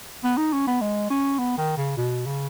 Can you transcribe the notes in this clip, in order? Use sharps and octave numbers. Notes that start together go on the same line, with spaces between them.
B3
D#4
C#4
B3
G#3
C#4
B3
D#3
C#3
B2
C#3